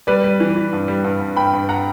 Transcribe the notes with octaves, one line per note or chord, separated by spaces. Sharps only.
G3 B4 D5
G3
E3
E3
G2
G3
G2
G2
G2 G5 B5
G2
F#5 A#5